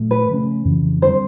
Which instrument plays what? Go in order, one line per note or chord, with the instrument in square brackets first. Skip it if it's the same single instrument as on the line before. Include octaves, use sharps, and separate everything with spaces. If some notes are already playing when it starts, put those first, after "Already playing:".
Already playing: [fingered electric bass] A#2 F#3 A3
[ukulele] B4
[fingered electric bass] C#3 F3 A3 C#4
F2 C#3 E3
[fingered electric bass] D3 G3 C4 [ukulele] C5